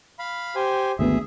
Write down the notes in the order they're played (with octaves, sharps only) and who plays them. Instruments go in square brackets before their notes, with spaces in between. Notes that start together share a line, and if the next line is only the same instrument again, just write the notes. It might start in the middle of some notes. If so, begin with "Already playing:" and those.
[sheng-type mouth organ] F5 B5
G4 C5 G#5
[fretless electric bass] G#1 D2 B3 [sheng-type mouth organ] G#4 E5